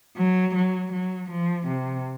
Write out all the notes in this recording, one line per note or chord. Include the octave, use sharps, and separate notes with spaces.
F#3
F#3
F#3
F3
C3